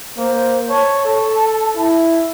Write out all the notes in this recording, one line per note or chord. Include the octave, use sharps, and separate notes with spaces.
A#3 C5
C#5 A5
A4
E4